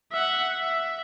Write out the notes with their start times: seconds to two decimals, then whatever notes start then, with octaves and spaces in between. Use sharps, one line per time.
0.12 E5 F#5
0.57 E5